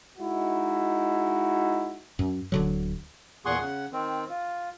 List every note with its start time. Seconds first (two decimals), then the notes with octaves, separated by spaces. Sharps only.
0.18 G#3 D#4 E4 F#4
2.19 F#2
2.52 D1 D3 F#3
3.45 E2 A#2 G#4 F#5 C6 C#6
3.61 C#3 F#5
3.92 D#3 C4
4.29 F4